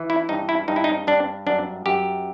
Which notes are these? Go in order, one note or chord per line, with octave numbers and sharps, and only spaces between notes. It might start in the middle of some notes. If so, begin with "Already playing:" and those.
Already playing: E3
E4
G2 D#4
E4
G2 D#4
E4
D#4
G2 D4
F#2 D4
F#2 G4